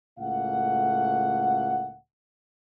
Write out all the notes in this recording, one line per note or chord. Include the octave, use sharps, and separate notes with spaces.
C#2 A2 A3 A#3 F5 F#5